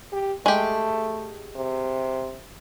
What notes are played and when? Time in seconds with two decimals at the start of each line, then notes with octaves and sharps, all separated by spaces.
0.12 G4
0.46 G#3 A3 G4
1.56 C3